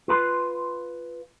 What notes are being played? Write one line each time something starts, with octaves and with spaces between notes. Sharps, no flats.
F4 B4 A#5 C6